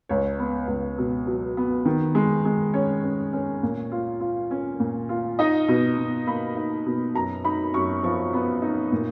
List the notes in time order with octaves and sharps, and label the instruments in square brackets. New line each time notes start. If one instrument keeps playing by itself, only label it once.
[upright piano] C#2 C#5
B3
C#2
B2
F#3
B3
D#3
G#3
G#3
C#4 C#5
C#4
C#4
A#2
F4
F4
C#4
A#2
F4
D#4 D#5
B2
B2
A#3 B5
D#4
B2
F#2 A#5
D#4 B5
F#2 C#6
F3 C#6
B3
D#4
A#2